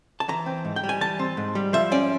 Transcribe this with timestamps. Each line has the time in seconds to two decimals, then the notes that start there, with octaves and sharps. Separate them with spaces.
0.20 A5
0.29 E3 A#5
0.46 C4
0.65 G#2
0.76 G5
0.84 G3
0.89 G#5
1.01 E3 A5
1.19 C4
1.37 G#2
1.55 G3
1.73 F3 E5
1.92 C#4 D5